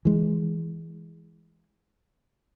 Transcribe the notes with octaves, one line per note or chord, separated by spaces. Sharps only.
E3 G#3